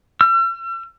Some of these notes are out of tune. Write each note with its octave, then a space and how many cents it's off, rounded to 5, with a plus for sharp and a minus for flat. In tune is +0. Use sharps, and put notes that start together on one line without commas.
E6 +45